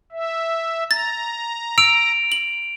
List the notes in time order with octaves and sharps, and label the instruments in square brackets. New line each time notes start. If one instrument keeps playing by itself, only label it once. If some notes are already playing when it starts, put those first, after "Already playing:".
[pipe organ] E5
[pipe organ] A#5 [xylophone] A6
[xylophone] E6 [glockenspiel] D7 F7
[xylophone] F#7